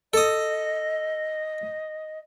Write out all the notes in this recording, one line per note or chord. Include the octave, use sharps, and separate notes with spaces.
A4 D#5 D#6